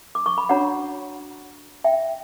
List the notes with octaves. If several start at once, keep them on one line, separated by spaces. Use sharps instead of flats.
D6
C#6
B5
D4 F#4 C#5 F#5 A#5
E5 G5